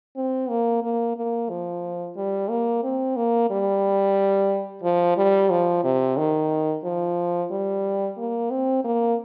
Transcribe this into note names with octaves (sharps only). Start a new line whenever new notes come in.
C4
A#3
A#3
A#3
F3
G3
A#3
C4
A#3
G3
F3
G3
F3
C3
D#3
F3
G3
A#3
C4
A#3